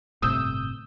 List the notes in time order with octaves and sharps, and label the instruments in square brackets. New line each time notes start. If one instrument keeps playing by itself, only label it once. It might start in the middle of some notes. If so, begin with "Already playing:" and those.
[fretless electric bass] G1 A2 C3 [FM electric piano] D#6 E6 G6